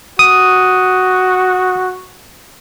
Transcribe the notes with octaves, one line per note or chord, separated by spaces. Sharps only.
F#4 D#6